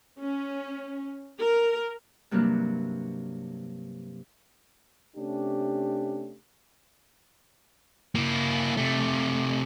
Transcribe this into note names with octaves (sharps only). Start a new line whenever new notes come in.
C#4
A#4
G2 C3 F#3 A#3 D4
C3 A3 C#4 D4 G4
A#3 E4
C3 A3